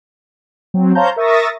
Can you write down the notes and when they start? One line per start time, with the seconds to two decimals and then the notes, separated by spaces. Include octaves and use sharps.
0.74 F#3 C4
0.95 C5 C#5 F5 A5 A#5 G6
1.16 A#4 E5 C#6 D#6 A6 A#6